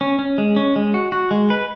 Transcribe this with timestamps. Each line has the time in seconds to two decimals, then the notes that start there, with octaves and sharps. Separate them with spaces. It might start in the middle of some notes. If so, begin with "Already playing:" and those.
0.01 C#4
0.19 C#4
0.38 G#3
0.56 C#4
0.76 G#3
0.94 F#4
1.12 F#4
1.31 G#3
1.50 B4